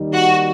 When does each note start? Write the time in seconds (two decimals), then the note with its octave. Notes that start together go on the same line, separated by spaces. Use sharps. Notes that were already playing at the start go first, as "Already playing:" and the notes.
Already playing: D#2 D#3 G3 D#4
0.13 F#4